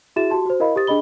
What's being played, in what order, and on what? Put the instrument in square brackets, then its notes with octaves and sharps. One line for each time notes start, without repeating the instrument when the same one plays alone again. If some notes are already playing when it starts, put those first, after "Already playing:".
[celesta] E4 F#4 G#4 E5 A6 E7
F#4 G4 A5 C6
F#4 C5
E4 A#4 D#5 F5 B5
G4 C5 D#6 A6
D4 G#4 D#5 B5 G7